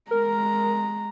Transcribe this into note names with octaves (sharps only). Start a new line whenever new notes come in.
G#3 A#4 A#5